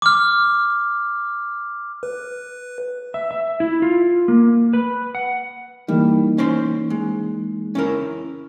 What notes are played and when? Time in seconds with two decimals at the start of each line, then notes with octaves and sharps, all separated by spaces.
0.02 D6 F6
2.03 B4
3.14 E5
3.31 E5
3.60 E4
3.82 F4
4.28 A#3
4.73 B4
5.15 F#5
5.88 E3 G3 A#3 D#4
6.38 C#4 C5 C6
6.90 G#3
7.75 C#4 E4 A#4